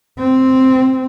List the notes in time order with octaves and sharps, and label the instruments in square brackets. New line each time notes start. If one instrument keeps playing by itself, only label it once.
[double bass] C4